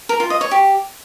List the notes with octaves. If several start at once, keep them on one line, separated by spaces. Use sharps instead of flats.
A#4
F4
D#5
C#5
G4